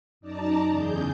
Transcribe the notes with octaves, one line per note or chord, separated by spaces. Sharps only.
F#2 D#4 D5 A5 A#5
E2 C#3 G#4 G6